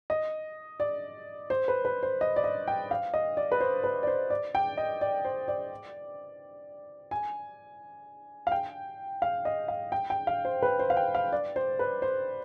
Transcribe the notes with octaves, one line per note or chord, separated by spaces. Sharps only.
D#5
D5
C5
B4
B4
C5
D#5
D5
D#5
G5
F5
D#5
D5
B4
C5
B4
D5
C5
D5
G5
D#5
D5
C5
D5
G#5
F5
G5
F5
D#5
F5
G5
G5
F5
C5
B4
C5
F5
G5
F5
D5
C5
B4
C5